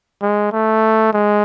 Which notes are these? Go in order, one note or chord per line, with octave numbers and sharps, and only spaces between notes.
G#3
A3
G#3